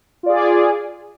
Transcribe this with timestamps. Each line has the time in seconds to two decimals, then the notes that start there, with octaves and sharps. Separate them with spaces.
0.23 F4
0.26 D5
0.29 G#4